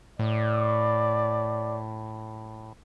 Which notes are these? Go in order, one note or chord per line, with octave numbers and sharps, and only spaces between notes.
A2 D5